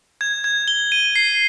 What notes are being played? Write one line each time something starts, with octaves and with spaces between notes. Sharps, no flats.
G#6
G#6
G7
D#7
C7